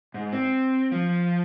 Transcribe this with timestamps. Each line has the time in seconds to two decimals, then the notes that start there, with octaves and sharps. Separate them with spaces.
0.14 G#2
0.33 C4
0.92 F3